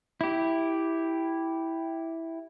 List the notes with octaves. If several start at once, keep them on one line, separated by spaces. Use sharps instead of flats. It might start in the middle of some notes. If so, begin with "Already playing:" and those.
E4 G4